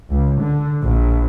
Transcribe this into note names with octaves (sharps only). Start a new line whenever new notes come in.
C#2
D3
A#1